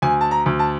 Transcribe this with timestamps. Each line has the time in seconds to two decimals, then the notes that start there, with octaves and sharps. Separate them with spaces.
0.02 D2 G#5
0.21 A5
0.31 A#5
0.46 D2
0.59 A5